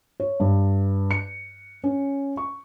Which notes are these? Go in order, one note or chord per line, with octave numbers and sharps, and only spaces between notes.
C#5
G2
C#7
C#4
C#6